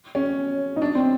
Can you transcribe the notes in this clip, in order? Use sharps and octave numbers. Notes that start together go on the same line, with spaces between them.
C#4
D#4
D4
C4